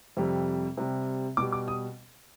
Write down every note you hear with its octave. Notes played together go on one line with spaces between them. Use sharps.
F2 C3 G3
C3 G3
B2 G3 D6
D6
D#6